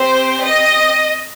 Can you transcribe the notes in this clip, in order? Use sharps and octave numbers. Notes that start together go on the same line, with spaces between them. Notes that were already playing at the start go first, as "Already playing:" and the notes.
Already playing: C4 G4 C5
D#5